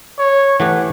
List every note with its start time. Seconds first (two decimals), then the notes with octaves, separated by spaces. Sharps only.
0.19 C#5
0.60 E3 A3 G4 F#5